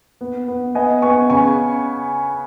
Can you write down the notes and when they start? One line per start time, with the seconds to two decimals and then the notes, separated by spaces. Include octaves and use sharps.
0.21 B3
0.48 B3
0.75 B3 D#5 G#5
1.02 B3 G#5 C#6
1.30 C#3 G#5 C#6